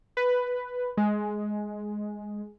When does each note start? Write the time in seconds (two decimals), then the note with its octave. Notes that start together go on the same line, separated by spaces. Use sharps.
0.17 B4
0.97 G#3